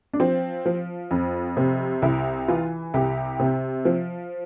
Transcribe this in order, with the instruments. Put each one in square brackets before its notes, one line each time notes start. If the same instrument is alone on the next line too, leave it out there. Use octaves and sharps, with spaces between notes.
[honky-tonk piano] D4
F3 C4
F3
F2
C3
C2 E4
E3 F4
C2 G4
C3
F3